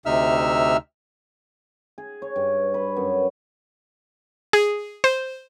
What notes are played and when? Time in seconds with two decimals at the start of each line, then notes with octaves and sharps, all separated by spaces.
0.06 D2 C3 D#4 E5 E6 F6
1.98 G#4
2.22 C#5
2.36 G2
2.74 B4
2.96 F#2
4.53 G#4
5.04 C5